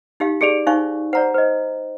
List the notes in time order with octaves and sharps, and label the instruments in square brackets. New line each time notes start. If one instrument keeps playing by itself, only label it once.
[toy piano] D#4 G4 F5
[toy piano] G4 G#4 D5 [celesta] C#7 D7 F7
[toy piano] D#4 C5 C#6 [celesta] F5 G#5
[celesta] C5 D5 [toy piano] F#5 A#5
[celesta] C5 D#5